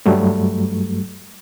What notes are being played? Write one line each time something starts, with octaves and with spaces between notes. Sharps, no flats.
G2 F#3 G3 A3